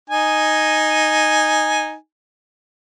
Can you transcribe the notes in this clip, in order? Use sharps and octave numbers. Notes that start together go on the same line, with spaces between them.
D#4 G#5